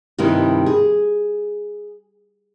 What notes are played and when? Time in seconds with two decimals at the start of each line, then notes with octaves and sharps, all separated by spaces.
0.18 G2 C3 D#3 D#4 E4
0.66 G#4